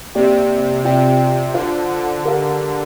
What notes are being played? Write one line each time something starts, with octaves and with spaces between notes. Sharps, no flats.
C3 A#3 G4 D5 G5
C3 F4 D5 G5
D3 F4 C5 F5
D3
G4 A#4 F5